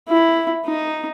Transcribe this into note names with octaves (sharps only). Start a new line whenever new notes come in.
E4
D#4